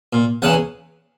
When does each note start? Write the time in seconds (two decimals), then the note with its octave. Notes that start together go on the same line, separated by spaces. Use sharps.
0.13 A#2
0.42 E2 C#3 E3 F#5